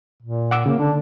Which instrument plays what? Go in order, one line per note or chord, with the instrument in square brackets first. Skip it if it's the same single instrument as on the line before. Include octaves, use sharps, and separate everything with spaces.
[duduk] A#2
[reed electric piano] F#5 D6 E6
[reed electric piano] C#3 [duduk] A#3
[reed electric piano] D3 [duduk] D4